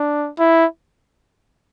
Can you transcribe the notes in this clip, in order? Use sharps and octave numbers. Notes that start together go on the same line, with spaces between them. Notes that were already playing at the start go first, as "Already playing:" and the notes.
Already playing: D4
E4